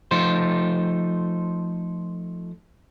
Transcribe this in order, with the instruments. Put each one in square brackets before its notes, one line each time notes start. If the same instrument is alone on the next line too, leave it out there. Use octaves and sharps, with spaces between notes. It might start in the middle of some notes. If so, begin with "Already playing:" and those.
[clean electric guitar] F3 A3 D#4 C5